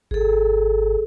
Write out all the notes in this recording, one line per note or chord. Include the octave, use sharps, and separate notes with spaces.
G#1 G#4 A4